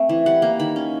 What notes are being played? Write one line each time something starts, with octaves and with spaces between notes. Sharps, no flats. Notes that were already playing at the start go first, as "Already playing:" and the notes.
Already playing: A3 C4
E3
G3 F#5
A#3
D#3 B5
C#4